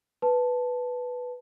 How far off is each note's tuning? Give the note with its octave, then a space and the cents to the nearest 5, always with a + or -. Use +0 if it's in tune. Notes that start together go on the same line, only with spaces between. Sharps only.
B4 +0 A5 -5